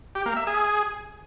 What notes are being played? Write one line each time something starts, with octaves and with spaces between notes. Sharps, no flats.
G4
A#3
E5
G#4